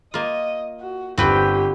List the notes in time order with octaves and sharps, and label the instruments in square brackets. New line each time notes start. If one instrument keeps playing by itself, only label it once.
[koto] A#3 F4 [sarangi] D#5
[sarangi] F#4
[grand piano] G1 [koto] C4 B4 G5 [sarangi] G4